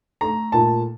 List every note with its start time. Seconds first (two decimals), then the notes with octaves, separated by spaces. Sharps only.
0.21 A3 A#5
0.52 A#2 A5